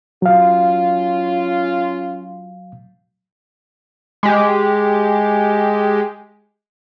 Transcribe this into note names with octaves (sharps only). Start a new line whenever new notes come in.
F#3 C#4 F4 F5
G#3 G4